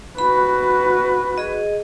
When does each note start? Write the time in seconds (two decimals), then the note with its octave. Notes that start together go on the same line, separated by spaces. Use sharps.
0.18 F#4 B4 B5
1.38 G#4 D#5